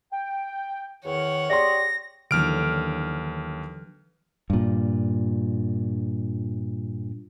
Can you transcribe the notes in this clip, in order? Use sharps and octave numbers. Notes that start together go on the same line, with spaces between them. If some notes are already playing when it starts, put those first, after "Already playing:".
G5
E2 D#3 C#5 F#5
G4 G#4 D5 C6 A#6
D#2 D3 E3 F#3 F6 D7
G2 A#2